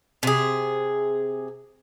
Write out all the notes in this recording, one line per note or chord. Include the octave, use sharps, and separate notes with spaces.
C3 G#4